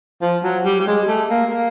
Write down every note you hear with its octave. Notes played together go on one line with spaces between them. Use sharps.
F3
F#3
G3
G3
G#3
A3
A#3
A#3